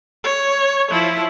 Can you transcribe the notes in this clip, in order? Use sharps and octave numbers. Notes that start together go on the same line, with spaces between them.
C#5
F3 E4